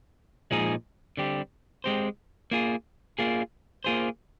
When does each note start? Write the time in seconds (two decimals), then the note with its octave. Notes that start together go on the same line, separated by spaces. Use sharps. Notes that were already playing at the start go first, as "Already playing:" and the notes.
0.51 A#2 F3 G#3 D#4 G#4
1.17 D3 G3 C4 G4
1.84 G#3 C4 G4 C5
2.51 A#3 F4 G#4
3.19 A#3 F4 G#4
3.84 A#3 F4 G#4 C5